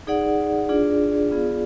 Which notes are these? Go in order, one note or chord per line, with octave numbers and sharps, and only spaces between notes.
D#4 G#4 D5 F#5
D4 F4 G#4 D5
B3 F4 G#4 D5 F5